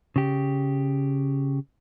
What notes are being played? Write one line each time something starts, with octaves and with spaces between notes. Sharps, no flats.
C#3 G4